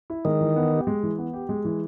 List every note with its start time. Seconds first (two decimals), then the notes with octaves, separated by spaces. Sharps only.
0.10 E4
0.25 D#3 G#3
0.41 E3
0.56 B3
0.72 G4
0.87 G#3
1.03 E3
1.18 B3
1.33 G4
1.49 G#3
1.65 E3